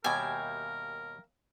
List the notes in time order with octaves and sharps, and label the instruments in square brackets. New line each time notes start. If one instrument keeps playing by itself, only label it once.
[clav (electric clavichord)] D#2 B2 G3 [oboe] A#4 [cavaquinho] E5 F5 G5 [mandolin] G#5